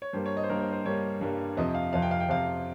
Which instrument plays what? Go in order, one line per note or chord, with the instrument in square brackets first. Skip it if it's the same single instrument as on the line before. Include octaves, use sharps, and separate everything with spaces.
[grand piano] C#5
G2 G3 A#3 C5
C#5
D#5
C5
G2 G3 A#3 A#4
C5
C5
G2 G3 A#3 C#5
G2 G3 A#3
F2 C3 F3 D#5
F5
F2 C3 F3 F5
G5
F5
G5
F2 C3 F3 F5